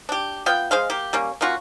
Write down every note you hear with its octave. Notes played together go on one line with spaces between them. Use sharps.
D4 G4
B3 F4 G5
G#3 G#4 C5 F5
A#3 G4
G3 A#3 C#4
A#3 C#4 F4 F#4